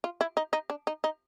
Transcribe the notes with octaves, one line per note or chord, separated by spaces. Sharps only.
F4
E4
D#4
D#4
D4
D#4
D#4